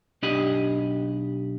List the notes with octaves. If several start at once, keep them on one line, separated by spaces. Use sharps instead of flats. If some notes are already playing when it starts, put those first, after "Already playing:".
B1 D4 G4 D#5 B5